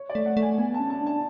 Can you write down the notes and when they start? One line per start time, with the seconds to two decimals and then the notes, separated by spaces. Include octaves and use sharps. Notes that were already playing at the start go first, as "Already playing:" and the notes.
Already playing: C#5
0.09 D5
0.15 A3
0.26 F#5
0.37 A3
0.42 G#5
0.58 B3 G#5
0.74 A5
0.79 C#4
0.90 A5
1.01 D4
1.06 A5